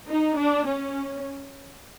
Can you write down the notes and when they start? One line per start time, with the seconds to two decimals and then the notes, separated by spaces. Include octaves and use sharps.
0.09 D#4
0.38 D4
0.67 C#4